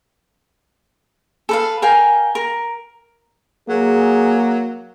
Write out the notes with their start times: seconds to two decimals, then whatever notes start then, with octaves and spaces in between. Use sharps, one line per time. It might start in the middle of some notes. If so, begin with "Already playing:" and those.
1.49 A4 B4 F5
1.82 A#4 F5 G5 G#5
2.35 A#4
3.69 F#3 A#3 G#4